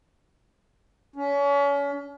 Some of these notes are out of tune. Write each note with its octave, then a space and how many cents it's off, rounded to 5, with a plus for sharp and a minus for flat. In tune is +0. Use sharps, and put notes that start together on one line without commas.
C#4 +35